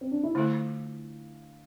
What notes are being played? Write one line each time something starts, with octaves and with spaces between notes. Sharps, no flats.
C4
D4
E4
D3 A3 E4 F4 A4